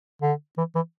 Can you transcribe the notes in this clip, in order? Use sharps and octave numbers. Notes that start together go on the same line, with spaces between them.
D3
E3
E3